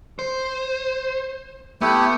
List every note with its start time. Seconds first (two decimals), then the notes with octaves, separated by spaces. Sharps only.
0.19 C5
1.81 A3 B3 E4 G4